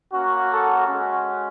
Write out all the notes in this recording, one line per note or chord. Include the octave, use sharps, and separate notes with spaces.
A#3 C#4 F#4
A4
G#3 C#4 F#4